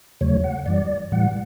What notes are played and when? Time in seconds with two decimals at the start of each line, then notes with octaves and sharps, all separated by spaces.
0.21 E2 C#3 F#3 A3 C#5
0.44 F#5
0.66 F#2 E3 G3 D5
1.12 A2 E3 G3 F#5